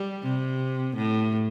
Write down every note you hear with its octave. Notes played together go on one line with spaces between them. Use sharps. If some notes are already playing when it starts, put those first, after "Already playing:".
Already playing: G3
C3
A2